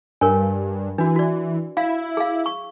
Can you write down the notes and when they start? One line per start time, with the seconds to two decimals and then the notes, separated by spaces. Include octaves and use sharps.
0.21 G2 A#4 C#5 G#5
0.98 E3 D4 F#4
1.16 F#4 D5
1.77 E4 F5
2.17 G#4 F5
2.46 C#6